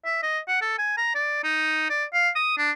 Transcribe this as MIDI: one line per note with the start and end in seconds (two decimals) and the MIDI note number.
0.05 0.18 76
0.23 0.39 75
0.48 0.62 78
0.62 0.75 69
0.79 0.97 80
0.97 1.14 82
1.15 1.43 74
1.44 1.85 63
1.90 2.04 74
2.13 2.29 77
2.36 2.56 87
2.58 2.71 62